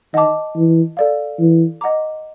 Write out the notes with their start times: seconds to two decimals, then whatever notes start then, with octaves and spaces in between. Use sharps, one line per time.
0.14 D#3 D#5 F#5 A5 D6
0.56 E3
0.97 A4 D5 F5
1.39 E3
1.81 D#5 F#5 A#5 D6